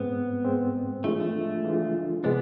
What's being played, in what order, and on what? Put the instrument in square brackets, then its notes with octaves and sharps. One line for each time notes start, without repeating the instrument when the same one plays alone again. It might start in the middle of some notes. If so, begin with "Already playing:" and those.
Already playing: [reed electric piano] G#2 G#3 C4 [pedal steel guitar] B3
[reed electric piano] G#2 G#3 C4
[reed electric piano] E3 G#3 D4 F4 [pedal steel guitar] A3
[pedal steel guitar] A3
[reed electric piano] E3 G#3 D4 F4
[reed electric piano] C3 G#3 C4 [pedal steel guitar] B3 D4